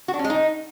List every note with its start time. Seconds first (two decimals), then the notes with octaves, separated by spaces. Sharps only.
0.08 F#4
0.14 D4
0.19 C#4
0.24 G#3
0.30 D#4